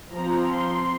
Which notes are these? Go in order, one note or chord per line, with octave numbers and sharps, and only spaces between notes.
F3 C4 A#5
C6